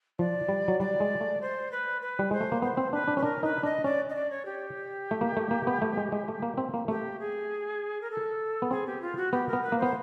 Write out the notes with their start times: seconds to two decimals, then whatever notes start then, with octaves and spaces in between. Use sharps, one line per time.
0.19 F3 D5
0.49 G3
0.68 F#3
0.79 G3 D5
1.00 G#3
1.21 A3
1.41 C5
1.71 B4
2.01 B4
2.19 G3
2.31 G#3 C5
2.41 A3
2.52 A#3
2.62 B3 C5
2.77 C4
2.93 D4 B4
3.07 D4
3.17 C#4 B4
3.23 D4 A#4
3.43 D#4 B4
3.63 D4 D#5
3.84 C#4 D5
4.09 D#5
4.14 D5
4.30 C#5
4.45 G4
5.11 A3
5.21 A#3
5.37 A3
5.51 A#3
5.67 B3
5.82 A3
5.97 G#3
6.12 G#3
6.28 A3
6.42 A#3
6.58 C4
6.74 A#3
6.88 A3 G4
7.19 G#4
8.01 A#4
8.10 A4
8.62 B3
8.71 C4 G#4
8.86 G4
9.01 F4
9.16 F#4
9.32 B3 G4
9.47 A#4
9.53 B3
9.63 B4
9.72 A#3
9.77 B3 C5